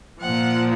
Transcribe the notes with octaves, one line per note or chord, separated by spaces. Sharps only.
A#2 F3 F#5